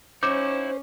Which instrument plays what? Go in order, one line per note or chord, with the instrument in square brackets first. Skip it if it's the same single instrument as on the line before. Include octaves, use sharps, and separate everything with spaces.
[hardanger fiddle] C#4 [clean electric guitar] D#4 E4 F#4 [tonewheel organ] C5 [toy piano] D6